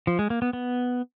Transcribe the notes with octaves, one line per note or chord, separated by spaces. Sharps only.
F3
G#3
A#3
B3
B3